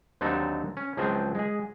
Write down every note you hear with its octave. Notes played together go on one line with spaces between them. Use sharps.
D#2 D3 F#3 C4 D#4 A4
C#4
C#2 F3 F#3 C4 G#4 C5
G#3 G#4